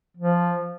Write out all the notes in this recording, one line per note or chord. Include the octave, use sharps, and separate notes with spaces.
F3